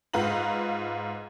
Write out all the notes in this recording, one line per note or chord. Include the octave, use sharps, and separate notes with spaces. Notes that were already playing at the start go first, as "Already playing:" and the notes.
G#2 F4 B4 A#5 F#7